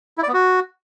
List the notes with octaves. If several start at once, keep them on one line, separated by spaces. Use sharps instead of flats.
E4
D5
B3
F#4